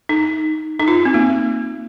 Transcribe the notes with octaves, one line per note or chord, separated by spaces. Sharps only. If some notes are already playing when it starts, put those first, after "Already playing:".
D#4
D#4
F4
C4
A#3